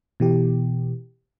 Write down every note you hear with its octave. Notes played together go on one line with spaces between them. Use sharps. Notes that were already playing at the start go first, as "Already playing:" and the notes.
B2 E3 G4